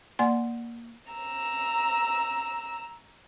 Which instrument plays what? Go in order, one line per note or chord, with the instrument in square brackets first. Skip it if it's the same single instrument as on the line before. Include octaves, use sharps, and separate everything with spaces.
[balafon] A#3 D5 F#5 G#5 C6
[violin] A#5 E6